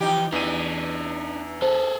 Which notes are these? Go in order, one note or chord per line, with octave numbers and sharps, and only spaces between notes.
E3 F3 D#4 G4
E2 E3 D4 D#4 D#7
G#4 A4 C5